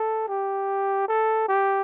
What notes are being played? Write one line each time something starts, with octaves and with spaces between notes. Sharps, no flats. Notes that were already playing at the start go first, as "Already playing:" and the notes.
Already playing: A4
G4
A4
G4